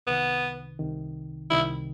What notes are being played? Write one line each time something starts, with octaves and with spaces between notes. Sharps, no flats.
C2 C3 D#3 B3
C2 C3 D#3
C2 C3 D#3 E4